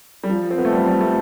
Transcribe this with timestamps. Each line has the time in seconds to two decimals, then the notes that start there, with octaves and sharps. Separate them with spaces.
0.23 G3
0.29 F3
0.51 C4
0.58 B3
0.65 A3
0.72 G3
0.86 G3
1.01 A3